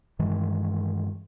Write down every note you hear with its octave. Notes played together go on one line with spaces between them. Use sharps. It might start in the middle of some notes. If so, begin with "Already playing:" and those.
G2 D#3 E3 G#3